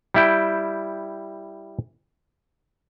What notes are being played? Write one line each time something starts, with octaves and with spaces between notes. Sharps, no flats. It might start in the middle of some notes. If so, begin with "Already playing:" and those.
G3 E4 G5